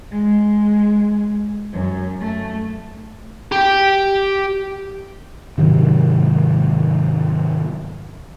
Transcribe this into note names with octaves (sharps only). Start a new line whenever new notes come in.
G#3
F#2
A3
G4 G5
G#2 C3 D#3 F#3